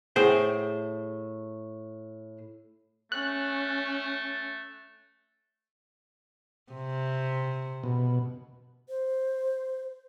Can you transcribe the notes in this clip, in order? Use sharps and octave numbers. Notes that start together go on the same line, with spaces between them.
A2 G#4 C5 F#5 G5
A3 C#4 F#6
C3
B2
C5